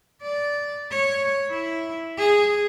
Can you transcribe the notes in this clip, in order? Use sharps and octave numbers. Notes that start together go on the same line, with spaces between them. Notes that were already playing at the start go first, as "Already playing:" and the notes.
D5
C#5
E4
G#4